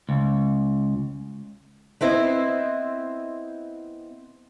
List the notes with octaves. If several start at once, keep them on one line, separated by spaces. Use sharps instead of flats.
C#2
B3 C4 E4 C5 D#5